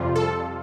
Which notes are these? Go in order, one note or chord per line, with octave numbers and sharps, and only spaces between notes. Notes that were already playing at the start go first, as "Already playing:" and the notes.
Already playing: F2 C3 G3 F4
A4